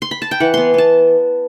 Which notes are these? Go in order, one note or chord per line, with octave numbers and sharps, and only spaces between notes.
C6
B5
A5
G5
E3 F#5
B3 C6
B3 A5